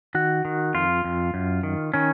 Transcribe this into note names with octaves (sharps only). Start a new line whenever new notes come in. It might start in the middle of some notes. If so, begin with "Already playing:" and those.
D#3 F#4
D#3
F2 F4
F2
F#2
D#3
D#3 C#4